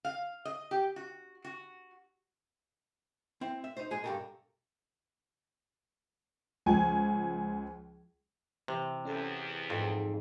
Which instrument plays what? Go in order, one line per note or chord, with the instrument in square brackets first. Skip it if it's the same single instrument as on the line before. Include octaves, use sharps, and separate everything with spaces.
[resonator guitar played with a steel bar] F5
D#5
G4
F#4
F#4
[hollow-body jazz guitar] C4 E4
E5
D#4 C5
A#2 G#3 G#4 D#5 G#5
B1 G2 C#3 G4 A4 A#4
[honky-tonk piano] C#2 F3 G#5
[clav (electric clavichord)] C3 [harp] E3
[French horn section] E2 [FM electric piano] C#4 A4 A5
[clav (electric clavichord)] F2 [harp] G#2